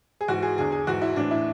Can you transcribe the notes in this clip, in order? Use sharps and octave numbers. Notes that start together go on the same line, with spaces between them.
G#4
G#2 E3 F#4
G#4
E2 D3 G#4
G#4
G#2 E3 F#4
E4
A2 E3 D4
E4